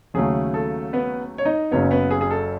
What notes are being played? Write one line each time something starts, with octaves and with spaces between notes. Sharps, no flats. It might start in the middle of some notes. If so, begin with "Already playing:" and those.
D#2 C#3 F#3 A3 G#4
A4
B3 B4
C#5
D#4 D#5
F#1 F#2 C#3 F#3 B3 C#4 C#5
B3 B4
G#4
G#4
A4